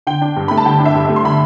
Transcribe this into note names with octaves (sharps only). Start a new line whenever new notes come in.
D3 G5
D4
G2
A3 B5
A5
D3 G5
D4
E5
G2
A3 E5
C6
D3 B5